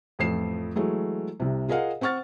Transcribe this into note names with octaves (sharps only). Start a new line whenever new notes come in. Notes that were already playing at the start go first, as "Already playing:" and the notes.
A1 F2 F3 A3 C7 E7
E3 F#3 G#3 A3
C2 C3
F4 G#4 A#4 D#5 F5 F#5
C4 F#5 C#6 F6 A6